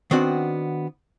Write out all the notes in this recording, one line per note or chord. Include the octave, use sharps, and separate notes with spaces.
D#3 B3 C4 D4 F#4